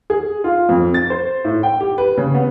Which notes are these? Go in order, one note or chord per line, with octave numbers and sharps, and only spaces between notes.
G#4
F4
F2
A6
C5
A2
G5
G4
B4
C#3
B3